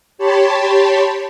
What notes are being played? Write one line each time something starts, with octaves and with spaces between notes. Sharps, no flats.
G4 C#5 A5 B5 C6